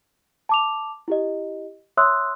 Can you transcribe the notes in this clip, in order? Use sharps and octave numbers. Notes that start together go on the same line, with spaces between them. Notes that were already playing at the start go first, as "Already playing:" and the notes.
A5 D6 F7
E4 G4 D#5
C#5 E5 C6 D#6 E6 F#6